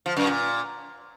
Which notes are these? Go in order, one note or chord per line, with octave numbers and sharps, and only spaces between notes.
F3
F#2
A#2